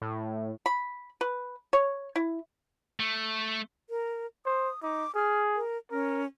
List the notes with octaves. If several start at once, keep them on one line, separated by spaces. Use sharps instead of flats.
A2
B5
B4
C#5
E4
A3
A#4
C5 D#6
D#4 D6
G#4 F6
A#4
C#4 A#4